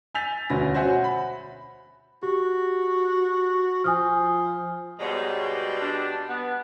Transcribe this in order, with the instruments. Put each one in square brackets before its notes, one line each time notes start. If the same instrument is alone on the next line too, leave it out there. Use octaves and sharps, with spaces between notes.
[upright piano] G#5 E6 G6 A6 B6 F7
E1 D2 C#4 B4 A#6
F#4 C5 C#5 E5 F#5 G#5
B5
[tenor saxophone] F#4 [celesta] G4
[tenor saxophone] F3 [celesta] G#5 D#6 F6
[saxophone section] G#2 C#5 [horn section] B2 G3 G#3
[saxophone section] D4
B3